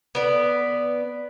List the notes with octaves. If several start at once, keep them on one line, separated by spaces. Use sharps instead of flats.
B3 D5